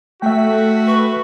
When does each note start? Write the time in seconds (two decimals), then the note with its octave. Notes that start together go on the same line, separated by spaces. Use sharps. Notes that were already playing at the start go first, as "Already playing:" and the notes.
0.22 A3 F#4 E5 G5 B6
0.87 B4 C#6